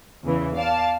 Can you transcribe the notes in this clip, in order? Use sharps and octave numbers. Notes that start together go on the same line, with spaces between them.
E2 C#3 E3
D5 F5 A5